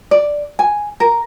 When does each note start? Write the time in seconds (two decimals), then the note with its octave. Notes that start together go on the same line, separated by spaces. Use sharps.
0.11 D5
0.59 G#5
1.00 A#4